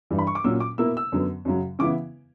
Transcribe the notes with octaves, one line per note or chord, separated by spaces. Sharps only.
G2 E3 G3
B5
C#6
D6
A#2 F#3 C#4 E6
D6
B2 A#3 E4 E6
E6
F#2 D3 F#3 B3
F#2 C#3 F#3
C#3 E3 B3 E4 D6